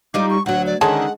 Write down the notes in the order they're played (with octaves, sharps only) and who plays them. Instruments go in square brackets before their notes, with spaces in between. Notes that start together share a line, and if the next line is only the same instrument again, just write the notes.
[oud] G3 D#4 F4 [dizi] D6
[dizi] C#6
[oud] D2 F#3 [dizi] F#5
[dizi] D5
[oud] D3 D#3 C#4 [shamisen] G#3 A5 [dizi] F#5